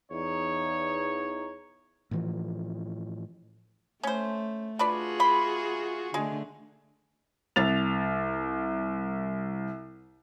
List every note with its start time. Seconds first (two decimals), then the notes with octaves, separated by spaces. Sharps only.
0.11 E2 D#4 C#5
2.11 A2 E3 F3
4.03 A3 C#4 C5
4.79 D4 F4 F#4 G#4 B4 D5
5.20 E3 B5 C6
6.14 D3 G#3 A3
7.56 C2 A6 F7